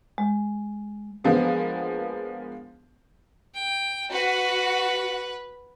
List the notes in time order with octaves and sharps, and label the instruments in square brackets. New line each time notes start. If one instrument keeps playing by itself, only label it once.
[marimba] G#3
[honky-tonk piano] F3 G#3 A#3 B3 D4
[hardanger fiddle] G5
[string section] F#4 [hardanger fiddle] B4